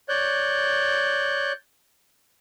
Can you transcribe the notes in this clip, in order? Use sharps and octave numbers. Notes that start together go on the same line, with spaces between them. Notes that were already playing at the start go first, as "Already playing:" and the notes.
C#5 D5 F#6 G6